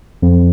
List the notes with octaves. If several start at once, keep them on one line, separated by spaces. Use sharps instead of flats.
F2